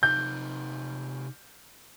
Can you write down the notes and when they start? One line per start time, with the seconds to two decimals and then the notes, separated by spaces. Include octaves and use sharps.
0.03 C3 D#4 G6